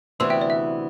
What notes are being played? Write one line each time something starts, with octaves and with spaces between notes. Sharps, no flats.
D2 C3 E3 B3 C6 E6
E5 G5
D5
E5